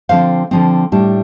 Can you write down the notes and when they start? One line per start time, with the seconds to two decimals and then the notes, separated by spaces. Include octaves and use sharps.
0.09 D3 F3 C4 C5 F5
0.51 D3 F3 C4
0.92 A2 G3 D4